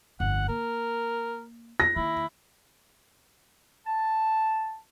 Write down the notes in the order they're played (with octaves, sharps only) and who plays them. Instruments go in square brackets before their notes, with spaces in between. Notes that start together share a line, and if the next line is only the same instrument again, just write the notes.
[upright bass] G1 F2 [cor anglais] F#5
[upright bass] A#3 [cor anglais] A#4
[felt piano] A#6
[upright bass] D#3 A#3 [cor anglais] E4
[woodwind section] A5